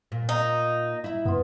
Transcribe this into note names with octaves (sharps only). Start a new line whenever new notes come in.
A#2
D#4
E4 E5
F#2 B3 F4